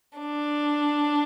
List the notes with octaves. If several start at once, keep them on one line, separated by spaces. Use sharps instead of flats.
D4